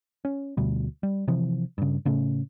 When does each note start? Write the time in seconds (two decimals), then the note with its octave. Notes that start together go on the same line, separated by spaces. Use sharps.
0.25 C#4
0.57 D2 B2 G3
1.03 G3
1.28 C3 E3 F3
1.78 G2 C#3
2.05 A2 C#3 A3 C#4